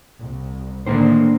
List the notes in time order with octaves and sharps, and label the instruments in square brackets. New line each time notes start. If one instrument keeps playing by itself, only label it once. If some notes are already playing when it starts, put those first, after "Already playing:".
[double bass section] C2
[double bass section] A2 D3 D#3 [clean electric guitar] A#3 D4 C5